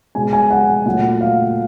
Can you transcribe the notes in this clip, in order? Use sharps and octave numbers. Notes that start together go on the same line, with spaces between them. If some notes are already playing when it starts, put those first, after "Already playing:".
B2 G#3 G#5
G#5
F#5
A#2 F#3 A3 F#5
F5